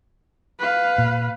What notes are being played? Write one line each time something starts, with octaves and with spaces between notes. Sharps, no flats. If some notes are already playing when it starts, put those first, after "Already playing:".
B4 F5
A#2